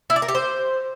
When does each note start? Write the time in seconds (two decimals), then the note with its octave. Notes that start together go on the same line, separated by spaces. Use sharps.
0.10 E4
0.16 D5
0.22 A#4
0.28 G4
0.35 C5